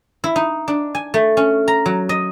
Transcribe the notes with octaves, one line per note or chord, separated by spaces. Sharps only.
E4
D#4
D4
G#5
A3
C#4
A#5
F#3
D#5